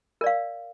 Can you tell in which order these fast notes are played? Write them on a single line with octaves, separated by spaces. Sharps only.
A#4 D5 F5